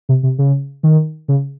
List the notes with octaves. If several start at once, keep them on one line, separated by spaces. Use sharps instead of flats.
C3
C3
C#3
D#3
C#3